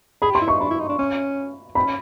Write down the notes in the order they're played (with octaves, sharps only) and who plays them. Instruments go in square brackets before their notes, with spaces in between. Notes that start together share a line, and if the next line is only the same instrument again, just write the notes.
[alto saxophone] G#4 [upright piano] B5
[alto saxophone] G4
[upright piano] C6
[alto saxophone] E4
[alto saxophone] D#4 [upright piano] C#6
[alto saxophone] D4 [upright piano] B5
[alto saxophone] E4
D#4
D4
C#4
[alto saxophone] C4 [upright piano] B5
[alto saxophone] C#4